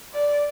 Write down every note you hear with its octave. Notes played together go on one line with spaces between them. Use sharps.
D5